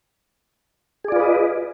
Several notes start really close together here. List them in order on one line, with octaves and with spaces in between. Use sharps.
G#4 D5 F4 B4 D#5